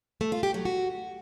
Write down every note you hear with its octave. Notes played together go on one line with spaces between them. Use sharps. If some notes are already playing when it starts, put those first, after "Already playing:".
A3
F4
G4
F#3
F#4